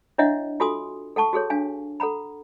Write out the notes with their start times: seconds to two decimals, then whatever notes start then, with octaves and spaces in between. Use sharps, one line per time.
0.18 D4 E4 C#5 D#5 E5 F#5
0.60 F4 F#4 A4 G#5 C6 D#6
1.16 A4 F#5 A5 C#6
1.33 F#4 G#4 A4 C#5
1.50 D4 F5 G#5
2.00 A4 F#5 A#5 B5